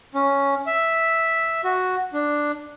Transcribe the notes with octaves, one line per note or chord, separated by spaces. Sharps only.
C#4
E5
F#4
D4